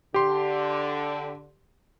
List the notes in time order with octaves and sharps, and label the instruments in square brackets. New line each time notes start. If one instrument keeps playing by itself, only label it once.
[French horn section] D3 [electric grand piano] G4 C6